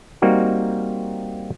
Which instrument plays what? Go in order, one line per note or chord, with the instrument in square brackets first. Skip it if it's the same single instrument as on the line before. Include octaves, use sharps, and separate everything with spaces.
[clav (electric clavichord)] G3 A#3 C4 D#4 F#4